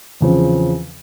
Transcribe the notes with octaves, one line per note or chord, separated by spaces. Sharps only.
E2 C#3 F3 C4